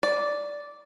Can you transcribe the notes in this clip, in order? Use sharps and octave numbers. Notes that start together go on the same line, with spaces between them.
D5